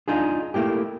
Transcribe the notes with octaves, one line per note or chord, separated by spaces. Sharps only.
D4 D#4 F4 G#4
A3 A#3 E4 G4